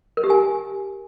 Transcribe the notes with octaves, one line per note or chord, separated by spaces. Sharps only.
A#4
G4
G#5